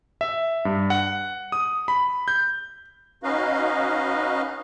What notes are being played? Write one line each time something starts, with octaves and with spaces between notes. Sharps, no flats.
E5
G2
F#5
D#6
B5
G6
C#4 D#4 F#4 B4 D#5 F5